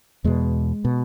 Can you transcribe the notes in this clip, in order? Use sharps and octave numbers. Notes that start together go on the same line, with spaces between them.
E2 B2 G#3
B2